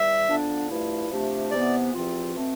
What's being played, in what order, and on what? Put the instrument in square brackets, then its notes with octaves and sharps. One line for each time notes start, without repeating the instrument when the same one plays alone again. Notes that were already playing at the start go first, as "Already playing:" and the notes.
Already playing: [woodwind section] E2 G3 [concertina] E5
[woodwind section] D3 F3 B3 D4
G2 F3 A3 E4
C3 F3 A3 D4 G4
[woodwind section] C3 E3 B3 [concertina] D5
[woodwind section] E2 C3 F3 C4 F4
B2 A3 C4